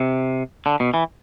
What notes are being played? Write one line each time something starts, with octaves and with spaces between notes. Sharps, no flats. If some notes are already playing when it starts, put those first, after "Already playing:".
Already playing: C3
D3
B2
E3